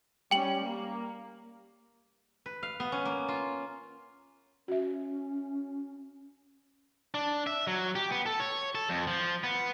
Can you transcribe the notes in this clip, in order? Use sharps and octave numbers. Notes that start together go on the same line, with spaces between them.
G3 C#4 G5 F#7
A#3
B4
F5
B3
C#4
A#3
F4
C#4 F#4 E5
D4
E5
F#3
G4
B3
A4
C#5
A4
F2
F3
B3